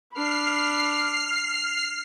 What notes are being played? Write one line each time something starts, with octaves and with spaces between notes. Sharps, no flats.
D4 B5 F6 C7